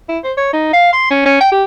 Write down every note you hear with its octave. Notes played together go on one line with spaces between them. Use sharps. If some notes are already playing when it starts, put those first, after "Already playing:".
E4
C5
C#5
D#4
F5
C6
C#4
C#4
G5
G4